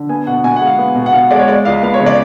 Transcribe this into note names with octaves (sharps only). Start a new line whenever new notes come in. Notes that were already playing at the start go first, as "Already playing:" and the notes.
Already playing: D3
B3 G#5
B2 F#5
B2 G#5
F#5
G#3
F5
B3
B2
F#5
B2 F5
G#3 D5
C#5
G#3 D5
C#2 F5
B3 F5
C#5
C#3
D5